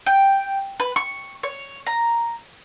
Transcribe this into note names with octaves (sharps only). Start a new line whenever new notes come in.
G5
B4
C#6
C#5
A#5